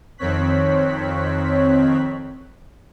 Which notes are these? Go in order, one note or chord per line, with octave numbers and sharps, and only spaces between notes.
F2 D#3 C4 C#5 F#6 B6